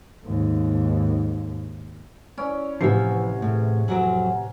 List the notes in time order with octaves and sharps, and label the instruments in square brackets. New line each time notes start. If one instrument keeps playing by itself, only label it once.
[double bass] D#2 G#2
[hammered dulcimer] C#4 [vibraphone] E4 D5 B5
[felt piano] A1 C3 C7 [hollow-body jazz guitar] F3 [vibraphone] E4 G#5 B5
[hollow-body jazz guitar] A2 [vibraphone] G#4
[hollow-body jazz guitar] F2 F#3 C4 [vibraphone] F#5 G#5 A#5